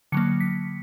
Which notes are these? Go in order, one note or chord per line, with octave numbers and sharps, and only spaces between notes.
D3 F#3 A#3 C#7
B6